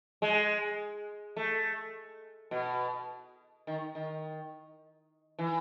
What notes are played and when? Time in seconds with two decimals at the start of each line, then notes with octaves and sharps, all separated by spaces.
0.22 G#3
1.37 A3
2.51 B2
3.67 D#3
3.95 D#3
5.39 E3